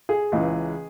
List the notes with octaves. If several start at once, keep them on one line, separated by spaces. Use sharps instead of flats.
G#4
C#2 C#3 E3